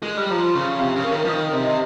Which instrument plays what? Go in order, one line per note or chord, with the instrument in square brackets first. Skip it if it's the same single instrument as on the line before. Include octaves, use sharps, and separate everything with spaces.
[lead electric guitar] G#3
G3
[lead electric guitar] F3 [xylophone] A#5
[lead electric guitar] C#3 [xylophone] C#6
[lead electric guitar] C3 [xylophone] F5
[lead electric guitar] C#3
[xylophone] A#4
[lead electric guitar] D#3
F3
[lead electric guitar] D#3 [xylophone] D#6
[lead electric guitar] C3 [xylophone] D#5